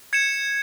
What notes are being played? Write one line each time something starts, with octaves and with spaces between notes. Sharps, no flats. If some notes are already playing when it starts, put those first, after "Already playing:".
G#6 C#7 E7